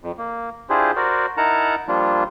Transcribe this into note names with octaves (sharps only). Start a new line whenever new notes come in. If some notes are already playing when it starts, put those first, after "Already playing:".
F2
A#3
D4 E4 F4 G4 G#4 C5
F#4 A#4 C5 D5
D#4 E4 A#4 F#5 A5 A#5
F3 G3 A#3 D4 F4